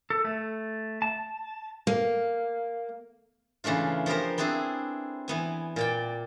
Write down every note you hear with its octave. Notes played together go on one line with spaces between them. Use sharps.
A4
A3
A5
A#3
C#3 E3 A3 D4 F4
F3 B3 G4 A#4 C5
B3 C4 D4 E4 G#4
E3 B3 G#5
A#2 D5 G5